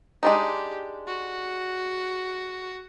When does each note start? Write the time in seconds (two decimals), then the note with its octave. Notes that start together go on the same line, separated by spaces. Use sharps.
0.23 G#3 D4 D#4 G4
1.07 F#4